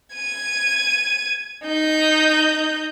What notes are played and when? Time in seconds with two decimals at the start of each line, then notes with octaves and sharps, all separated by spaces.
0.16 G#6 D#7
1.66 D#4 G6